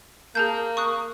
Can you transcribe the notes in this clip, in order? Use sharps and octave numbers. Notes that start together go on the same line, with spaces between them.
A#3 G#4 A5 G6
C#6 D#6 F#6